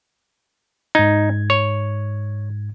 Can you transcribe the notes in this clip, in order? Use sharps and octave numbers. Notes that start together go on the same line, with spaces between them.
G#2 D#4 G#6
C#5